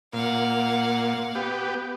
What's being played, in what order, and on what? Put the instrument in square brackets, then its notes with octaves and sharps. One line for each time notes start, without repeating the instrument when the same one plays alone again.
[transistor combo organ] A#2 [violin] F5 F#5
[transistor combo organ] B3 G4